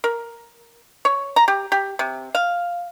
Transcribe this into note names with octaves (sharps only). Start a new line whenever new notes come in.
A#4
C#5
A#5
G4
G4
C3
F5